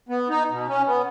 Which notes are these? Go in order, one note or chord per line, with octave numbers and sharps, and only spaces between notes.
B3
D#4
B2
C#4
B3